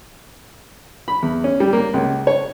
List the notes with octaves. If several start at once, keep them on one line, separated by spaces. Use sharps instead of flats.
B5
E2
C#4
G3
A#3
C#2
C#5